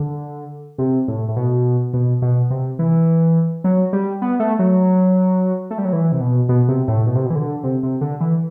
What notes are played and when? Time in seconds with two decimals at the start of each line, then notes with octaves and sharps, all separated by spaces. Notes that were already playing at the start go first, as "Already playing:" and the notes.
Already playing: D3
0.78 C3
1.08 A2
1.29 A2
1.36 B2
1.94 B2
2.22 B2
2.50 C3
2.79 E3
3.64 F#3
3.93 G3
4.22 B3
4.40 A3
4.59 F#3
5.71 A3
5.78 G3
5.85 F#3
5.93 E3
6.12 C3
6.20 B2
6.49 B2
6.68 C3
6.88 A2
7.06 B2
7.15 C3
7.26 B2
7.30 E3
7.35 D3
7.64 C3
7.83 C3
8.01 D3
8.21 E3